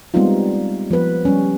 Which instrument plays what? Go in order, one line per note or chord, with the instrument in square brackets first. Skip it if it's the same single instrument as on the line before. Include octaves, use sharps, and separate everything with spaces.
[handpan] G3 G#3 B3 C4 D#4 F4
F3 B3 B4
G3 C#4